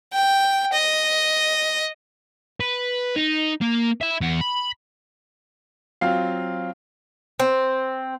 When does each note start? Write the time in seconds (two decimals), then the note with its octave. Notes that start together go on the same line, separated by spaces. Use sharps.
0.13 G5
0.73 D#5
2.60 B4
3.16 D#4
3.62 A#3
4.01 E5 B5
4.21 E2 F#5
4.41 B5
6.01 F#3 C4 F4 F5
7.40 C4